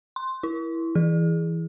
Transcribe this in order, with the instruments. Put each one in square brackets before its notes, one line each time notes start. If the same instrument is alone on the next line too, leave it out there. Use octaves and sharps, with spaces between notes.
[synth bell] C6
E4
[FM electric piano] E3 [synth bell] G#4